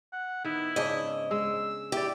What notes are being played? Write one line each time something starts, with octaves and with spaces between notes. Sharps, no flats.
F#5
D#3 B3 E4
G#2 C#3 D4 D#5
G#3 E6
E4 G4 D5